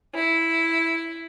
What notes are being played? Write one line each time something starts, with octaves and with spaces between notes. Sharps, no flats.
E4